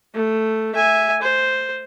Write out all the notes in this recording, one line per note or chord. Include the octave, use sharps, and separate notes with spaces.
A3
E5 G#5
C5